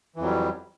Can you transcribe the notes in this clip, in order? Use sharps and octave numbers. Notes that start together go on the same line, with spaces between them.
F2 E3 F#3 G3